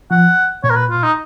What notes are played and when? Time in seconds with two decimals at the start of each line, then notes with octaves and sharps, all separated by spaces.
0.11 F3 F#5
0.64 A#2 C#5
0.70 A#4
0.76 B4
0.90 F4
1.03 D#4